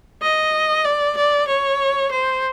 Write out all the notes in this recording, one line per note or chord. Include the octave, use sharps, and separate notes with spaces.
D#5
D5
D5
C#5
C5